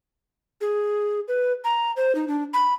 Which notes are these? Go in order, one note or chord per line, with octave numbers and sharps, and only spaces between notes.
G#4
B4
A#5
C5
D#4
D4
B5